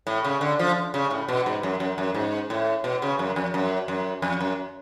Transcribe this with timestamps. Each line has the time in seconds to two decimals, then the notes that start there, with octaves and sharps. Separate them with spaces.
0.07 A2
0.24 C#3
0.41 D3
0.59 F3
0.94 C#3
1.11 A2
1.28 B2
1.46 G#2
1.63 F#2
1.80 F#2
1.98 F#2
2.14 G#2
2.50 A2
2.84 B2
3.02 C#3
3.19 F#2
3.36 F2
3.54 F#2
3.88 F#2
4.22 F2
4.40 F#2